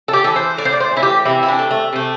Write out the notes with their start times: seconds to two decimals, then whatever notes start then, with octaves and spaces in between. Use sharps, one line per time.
0.08 A4
0.13 G4
0.24 E3 A4
0.36 C5
0.57 A2 D5
0.65 C5
0.73 D5
0.80 C5
0.92 E3 E4
1.03 G4
1.25 C3 E4
1.43 E4
1.48 D4
1.59 A3
1.71 A3
1.93 C3 A3